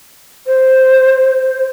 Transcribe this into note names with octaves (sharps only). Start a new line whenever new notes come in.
C5